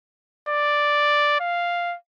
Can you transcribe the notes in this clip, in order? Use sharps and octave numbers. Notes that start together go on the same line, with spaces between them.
D5
F5